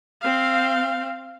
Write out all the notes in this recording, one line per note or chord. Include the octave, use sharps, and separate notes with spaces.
C4 F5